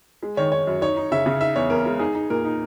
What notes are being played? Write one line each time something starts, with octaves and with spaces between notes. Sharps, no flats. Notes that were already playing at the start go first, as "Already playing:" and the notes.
G#3
D#3 C#5
D#3 C#5
F#2
D#4 C#5
D#4
C#3 E5
C#3
D#4 E5
E2 C#5
E2 A#4
G#3
D#4 G#4
D#4
A#2 A#4
D#4